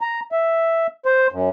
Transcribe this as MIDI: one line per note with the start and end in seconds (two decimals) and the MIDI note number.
0.01 0.20 82
0.32 0.87 76
1.06 1.27 72
1.32 1.50 42